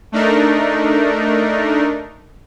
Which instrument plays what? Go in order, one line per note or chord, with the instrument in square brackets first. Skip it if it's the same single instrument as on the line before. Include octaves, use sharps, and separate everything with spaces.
[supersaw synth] A3 D4 D#4 A#4